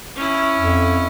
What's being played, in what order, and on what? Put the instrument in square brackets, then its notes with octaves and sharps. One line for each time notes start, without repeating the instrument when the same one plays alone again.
[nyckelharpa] C#4 E4
[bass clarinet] F2